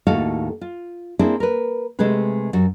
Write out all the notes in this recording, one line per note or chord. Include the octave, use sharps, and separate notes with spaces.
D#2 A2 A3 F#4 A4 F5
F4
A#3 C4 D4 E4 G#4 A4
A#4 B4
C3 G#3 A3 G4 G#4 B4
F#2 F#4